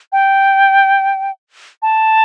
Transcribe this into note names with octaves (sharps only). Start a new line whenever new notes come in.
G5
A5